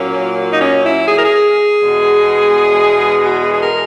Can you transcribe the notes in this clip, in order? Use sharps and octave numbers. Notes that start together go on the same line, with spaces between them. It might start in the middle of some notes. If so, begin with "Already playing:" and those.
Already playing: A#2 F#3 A#3 C#4
D#4
C#4
E4
G#4
A#4
G#4
E2 B2 G#3
F#4
G#4
G#4
A#4